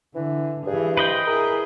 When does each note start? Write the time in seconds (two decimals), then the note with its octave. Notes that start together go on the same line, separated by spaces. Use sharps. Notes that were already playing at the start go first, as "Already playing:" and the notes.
0.15 D3 E3
0.67 G2 E3 G#4
0.97 B4 C5 D#5 G5
1.27 E4 G#4 A#4